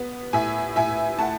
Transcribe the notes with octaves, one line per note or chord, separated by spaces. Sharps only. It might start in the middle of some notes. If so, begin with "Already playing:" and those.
Already playing: B3
A2 E5 G#5
A2 E5 G#5
A3 F#5 A5